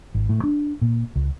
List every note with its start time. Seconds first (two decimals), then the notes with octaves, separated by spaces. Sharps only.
0.15 G#1
0.29 A2
0.44 D4
0.82 A#2
1.16 C#2